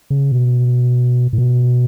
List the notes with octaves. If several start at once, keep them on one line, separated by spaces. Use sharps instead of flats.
C#3
B2
A2
B2